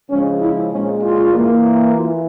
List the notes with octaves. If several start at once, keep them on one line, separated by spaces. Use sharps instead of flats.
C#3 F3 G#3 C#4
E4
A#2 G#3 C#4
F4
E3 A#3
E3 F4